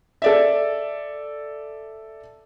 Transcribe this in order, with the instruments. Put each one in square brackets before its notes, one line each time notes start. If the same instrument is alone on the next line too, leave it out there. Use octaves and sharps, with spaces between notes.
[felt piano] A4 D5 E5